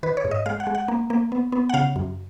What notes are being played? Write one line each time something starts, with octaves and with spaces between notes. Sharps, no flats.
D#3 B4
C#5
G#2
D#5
G#3 F5
F#5
G#3
F#5
A#3
A#3
B3
B3
F#5
C#3 F5
F#2